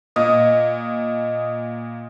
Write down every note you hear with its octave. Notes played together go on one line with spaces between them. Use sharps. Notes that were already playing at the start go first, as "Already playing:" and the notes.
A#2 D#5